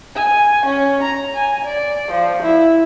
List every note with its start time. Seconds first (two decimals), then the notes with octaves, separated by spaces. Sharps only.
0.16 G#5
0.66 C#4
1.03 A#5
1.35 G#5
1.65 D5
2.11 F3
2.43 E4